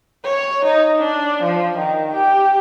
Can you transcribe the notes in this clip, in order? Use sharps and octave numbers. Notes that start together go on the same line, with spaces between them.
C#5
D#4
D4
F3
D#3
G4